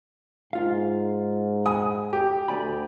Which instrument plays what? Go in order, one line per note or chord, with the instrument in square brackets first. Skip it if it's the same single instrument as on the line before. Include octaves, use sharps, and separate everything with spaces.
[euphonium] G#2 [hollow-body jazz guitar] F4 F5
[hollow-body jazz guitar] F#5 G#5 B5 [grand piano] D#6
[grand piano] G4
[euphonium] D2 [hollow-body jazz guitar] D5 G#5 B5